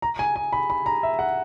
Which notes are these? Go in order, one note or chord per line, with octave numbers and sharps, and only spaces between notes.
A#5
G#5
G#5
B5
B5
A#5
E5
F#5